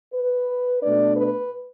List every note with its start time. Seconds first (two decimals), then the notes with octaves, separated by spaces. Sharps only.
0.14 B4
0.81 B2 A3 D4 D5
1.16 B4